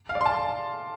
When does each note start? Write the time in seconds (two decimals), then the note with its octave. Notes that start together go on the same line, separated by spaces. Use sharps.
0.09 F5
0.15 D5
0.21 C6
0.26 A5